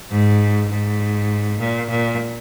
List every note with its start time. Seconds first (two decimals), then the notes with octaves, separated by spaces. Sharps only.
0.11 G#2
0.70 G#2
1.60 A#2
1.90 A#2